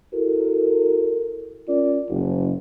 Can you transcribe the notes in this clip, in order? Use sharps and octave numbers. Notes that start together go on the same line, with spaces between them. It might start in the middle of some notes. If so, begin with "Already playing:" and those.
E4 F#4 A4 A#4
C#4 F4 A#4 D5
F#1